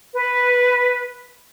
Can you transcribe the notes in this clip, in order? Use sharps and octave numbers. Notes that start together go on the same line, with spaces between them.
B4